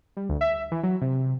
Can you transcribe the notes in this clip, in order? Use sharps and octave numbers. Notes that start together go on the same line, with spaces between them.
G3
D2
E5
E3
F#3
C3